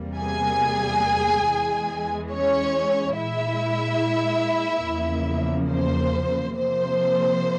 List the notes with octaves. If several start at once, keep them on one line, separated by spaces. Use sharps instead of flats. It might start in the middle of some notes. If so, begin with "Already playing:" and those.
Already playing: E2 C3 G3 A#3
G#4 G#5
E2 E3 G#3
C#4 C#5
A#2 G#3 E4 E5
E2 C#3 F3 A#3
C5
C3 F3 A#3 C5